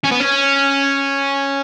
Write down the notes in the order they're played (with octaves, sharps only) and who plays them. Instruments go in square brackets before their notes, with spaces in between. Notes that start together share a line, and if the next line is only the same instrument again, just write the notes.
[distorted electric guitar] C#4
B3
C#4